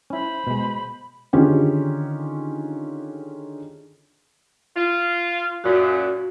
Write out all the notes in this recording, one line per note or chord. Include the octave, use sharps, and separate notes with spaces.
C#4 E4 C5 B5
B2 G#3
D3 D#3 C#4 F4 G4 G#4
F4
F#2 A#2 F#4